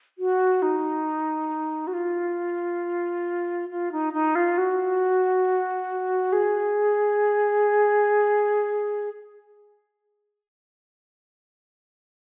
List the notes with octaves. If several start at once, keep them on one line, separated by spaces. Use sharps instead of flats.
F#4
D#4
F#4
F4
F4
D#4
D#4
F4
F#4
G#4